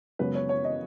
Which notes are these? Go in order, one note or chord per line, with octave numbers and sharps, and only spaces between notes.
F#2 C#3 G#3 B3 B4
C#5
C#5
D#5